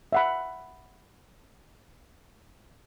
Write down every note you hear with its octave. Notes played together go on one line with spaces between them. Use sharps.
E5 F#5 B5